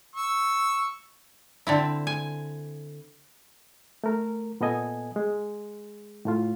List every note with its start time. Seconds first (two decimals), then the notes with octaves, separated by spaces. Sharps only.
0.15 C#6 E6
1.67 D3 C4 E4
2.07 G#5
4.04 A3 A#4
4.61 A#2 B3 A4 D#5 G#5
5.16 G#3
6.25 A2 A3 F4